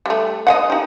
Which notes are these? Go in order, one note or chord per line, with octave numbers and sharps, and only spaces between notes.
G3 A3
D#5 F5 F#5
D#4 G4